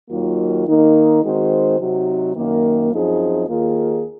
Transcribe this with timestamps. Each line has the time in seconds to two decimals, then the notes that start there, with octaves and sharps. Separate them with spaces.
0.10 D#2 D#3 F#3 A#3 F4
0.66 D#3 A#3 D#4
1.22 D#3 G#3 C4 F#4 C5
1.79 C3 F#3 C4 D#4 F#4
2.35 F#2 D#3 A#3
2.92 F#2 F3 C4 D#4 G#4
3.47 D#2 D#3 A#3 F4 G#4